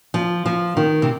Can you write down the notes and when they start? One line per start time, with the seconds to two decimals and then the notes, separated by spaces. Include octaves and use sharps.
0.14 F3
0.46 F3
0.77 D#3
1.02 C3